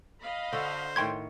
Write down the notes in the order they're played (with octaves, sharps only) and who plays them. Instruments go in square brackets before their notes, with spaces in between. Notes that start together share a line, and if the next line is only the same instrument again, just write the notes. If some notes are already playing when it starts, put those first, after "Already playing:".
[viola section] D#5 F5 B5
[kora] D3 F#4 A4 [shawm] C5
[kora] A2 D#3 C#5 [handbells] G5 C6 G#6